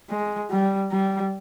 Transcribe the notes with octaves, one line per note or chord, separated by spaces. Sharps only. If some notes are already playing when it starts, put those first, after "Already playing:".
G#3
G3
G3